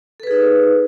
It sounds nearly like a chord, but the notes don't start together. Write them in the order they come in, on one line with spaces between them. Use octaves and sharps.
A4 B4 G#4 D#4